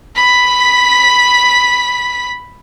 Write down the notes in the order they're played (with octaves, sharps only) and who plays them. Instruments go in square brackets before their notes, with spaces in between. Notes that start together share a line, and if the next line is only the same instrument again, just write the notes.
[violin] B5 B6